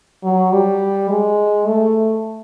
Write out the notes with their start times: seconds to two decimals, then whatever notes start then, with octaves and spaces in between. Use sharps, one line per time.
0.23 F#3
0.52 G3
1.09 G#3
1.67 A3